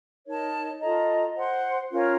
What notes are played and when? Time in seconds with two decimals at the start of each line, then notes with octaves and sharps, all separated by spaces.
0.25 D#4 A#4 C#5 A5
0.81 F4 A4 D#5 A#5
1.35 C5 F#5 C6
1.90 C#4 F4 A#4 C#5